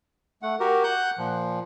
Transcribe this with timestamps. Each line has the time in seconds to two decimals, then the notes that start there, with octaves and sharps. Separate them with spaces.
0.43 A3 F#5
0.60 F#4 G4 A#4
0.84 F#5 F#6 G6
1.18 A#2 F3